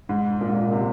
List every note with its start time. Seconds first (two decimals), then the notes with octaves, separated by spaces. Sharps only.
0.09 G#2
0.41 A#2
0.49 G#2
0.56 A#2
0.72 C3